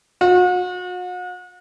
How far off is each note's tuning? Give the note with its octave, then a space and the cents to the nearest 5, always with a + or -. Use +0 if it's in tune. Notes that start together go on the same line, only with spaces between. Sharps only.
F#4 -40